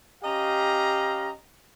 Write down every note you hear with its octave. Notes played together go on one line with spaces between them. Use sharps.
C#4 G4 D#5 F5 A#5